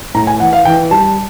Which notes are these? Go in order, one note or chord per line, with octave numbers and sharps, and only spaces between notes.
A2 A#5
G#5
E3 F#5
F5
E3 G5
G3 A5